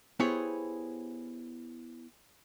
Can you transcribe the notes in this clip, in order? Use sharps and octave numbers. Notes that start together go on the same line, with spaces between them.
B3 E4 G4 G#4 C5 C#5